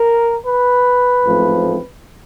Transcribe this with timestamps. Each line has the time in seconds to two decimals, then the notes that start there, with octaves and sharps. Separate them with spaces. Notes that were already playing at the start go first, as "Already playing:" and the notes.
Already playing: A#4
0.44 B4
1.23 A1 G#2 F3 A3 C4